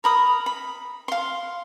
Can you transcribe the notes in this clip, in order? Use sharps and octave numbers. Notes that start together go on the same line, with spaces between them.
A#4 B5 D#6
B5
F5 C6